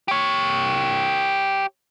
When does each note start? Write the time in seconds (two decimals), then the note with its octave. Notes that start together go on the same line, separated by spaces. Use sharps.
0.08 G4 C#5